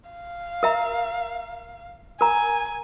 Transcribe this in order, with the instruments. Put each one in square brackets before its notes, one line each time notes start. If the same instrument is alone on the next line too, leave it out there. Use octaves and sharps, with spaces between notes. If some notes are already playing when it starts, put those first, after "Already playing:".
[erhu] F5
[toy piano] A#4 E5 A#5
[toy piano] A#4 A#5 [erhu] G#5